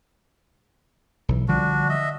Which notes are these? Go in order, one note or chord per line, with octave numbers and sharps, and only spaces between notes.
B1 E3
D3 F3 G3 D4 F#4
D#5 E5